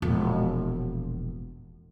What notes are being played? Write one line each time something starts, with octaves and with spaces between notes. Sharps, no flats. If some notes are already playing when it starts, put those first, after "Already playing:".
E1 A#1